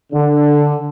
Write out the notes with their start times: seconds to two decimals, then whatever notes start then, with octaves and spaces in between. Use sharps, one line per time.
0.13 D3